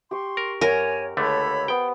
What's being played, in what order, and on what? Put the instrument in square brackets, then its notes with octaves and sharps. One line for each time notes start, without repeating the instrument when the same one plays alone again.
[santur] G4 C#6 [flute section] C6
[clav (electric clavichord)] A#4
[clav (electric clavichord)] F#2 [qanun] A#4 [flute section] C#5 G#5
[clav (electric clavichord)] C#2 D3 A3 [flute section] A4 C#5 B5
[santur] B3 C5 [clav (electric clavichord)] G5